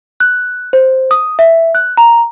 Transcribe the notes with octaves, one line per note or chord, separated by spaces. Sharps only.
F#6
C5
D#6
E5
F#6
A#5